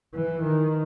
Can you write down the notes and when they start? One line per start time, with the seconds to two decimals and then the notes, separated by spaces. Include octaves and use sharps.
0.15 E3
0.43 D#3